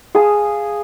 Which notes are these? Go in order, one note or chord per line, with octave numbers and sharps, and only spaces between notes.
G#4 F5 A5 D#6